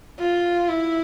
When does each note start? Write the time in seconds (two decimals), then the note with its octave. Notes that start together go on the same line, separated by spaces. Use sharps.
0.19 F4
0.69 E4